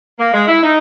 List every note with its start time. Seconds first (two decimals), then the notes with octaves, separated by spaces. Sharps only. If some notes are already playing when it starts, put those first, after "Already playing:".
0.19 A#3
0.33 G#3
0.48 E4
0.63 D#4